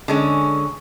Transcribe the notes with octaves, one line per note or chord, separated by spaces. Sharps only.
D3 G#3 C#4